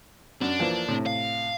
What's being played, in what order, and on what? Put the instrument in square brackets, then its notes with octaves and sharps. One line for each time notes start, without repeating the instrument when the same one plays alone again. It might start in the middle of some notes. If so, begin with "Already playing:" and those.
[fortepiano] F#2 [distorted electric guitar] D4
[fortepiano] E3 F3 A#3
A2 C3
[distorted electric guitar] F5